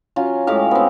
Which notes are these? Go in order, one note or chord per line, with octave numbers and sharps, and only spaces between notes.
F#3 C#4 F4
A2 G#3 G4 F5
B3 C4